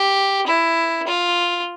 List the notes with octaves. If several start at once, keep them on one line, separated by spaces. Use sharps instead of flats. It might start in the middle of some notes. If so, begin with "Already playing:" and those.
Already playing: G4
E4
F4